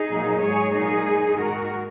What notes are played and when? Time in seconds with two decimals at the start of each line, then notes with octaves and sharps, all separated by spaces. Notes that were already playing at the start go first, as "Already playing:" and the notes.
Already playing: D#4 G#4
0.10 A#2 F#3 A#3
0.41 G#2 G#3 G#4 C#5
0.73 A#2 F#3 A#3 D#4 G#4
1.06 A#2 G#3
1.38 G#2 D#3 G#3 F#4 A#4